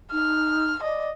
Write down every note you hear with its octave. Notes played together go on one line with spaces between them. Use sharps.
D#4 F6
D5 D#5